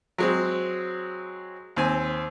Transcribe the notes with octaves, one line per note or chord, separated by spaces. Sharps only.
F#3 G#3 C4
D#2 C4 G#5